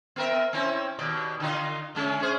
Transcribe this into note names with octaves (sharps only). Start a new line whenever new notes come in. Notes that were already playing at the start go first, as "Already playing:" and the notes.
B3 A#4 E5
C4 C#4 E4
D#2 B2 D5
D3 D#4 F4
D3 G#3 C#4
C#4 G#4 C5